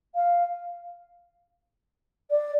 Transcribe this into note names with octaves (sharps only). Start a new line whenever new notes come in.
F5
D5